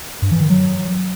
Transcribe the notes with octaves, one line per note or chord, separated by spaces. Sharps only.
G2
E3
D#3
F#3